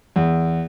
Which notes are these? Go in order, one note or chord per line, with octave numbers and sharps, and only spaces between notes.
E2